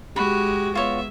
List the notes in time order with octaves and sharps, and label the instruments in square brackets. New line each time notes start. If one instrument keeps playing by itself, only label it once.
[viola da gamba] G#3 [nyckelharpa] F#4 [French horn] G4 [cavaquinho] B5
[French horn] B3 [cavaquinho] F4 C#5 [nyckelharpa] E5